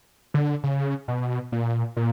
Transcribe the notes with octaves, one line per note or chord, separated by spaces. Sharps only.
D3
C#3
B2
A#2
A#2